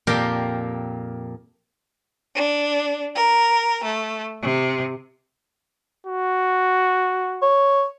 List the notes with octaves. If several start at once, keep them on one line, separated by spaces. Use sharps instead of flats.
F2 A#2 A#3 G4 A#4 G5
D4
A#4
A3
C3
F#4
C#5